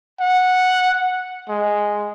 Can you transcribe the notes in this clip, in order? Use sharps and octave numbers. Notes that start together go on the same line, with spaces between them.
F#5
G#3